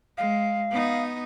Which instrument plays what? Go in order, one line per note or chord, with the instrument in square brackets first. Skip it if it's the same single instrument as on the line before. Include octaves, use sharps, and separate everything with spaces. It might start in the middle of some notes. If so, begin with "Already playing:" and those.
[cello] G#3 [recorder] F5
[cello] B3 D#4